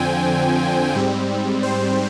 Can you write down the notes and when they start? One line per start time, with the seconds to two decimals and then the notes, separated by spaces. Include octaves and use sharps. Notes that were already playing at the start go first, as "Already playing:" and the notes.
Already playing: F2 D3 F3 C4 G5 G#5
0.95 G#2 G3 C4
1.63 C5